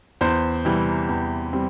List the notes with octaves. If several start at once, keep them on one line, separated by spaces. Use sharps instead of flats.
E2 C5
C3 E3 G3 C4
E2
G3 C4